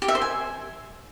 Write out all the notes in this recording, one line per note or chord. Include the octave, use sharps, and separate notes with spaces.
G4
E5
C5
G#5